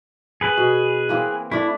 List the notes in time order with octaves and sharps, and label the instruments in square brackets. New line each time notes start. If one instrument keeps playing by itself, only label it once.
[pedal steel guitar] G#4 B4
[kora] B2
E3 A#3 C4
[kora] A3 D4 [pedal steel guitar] E4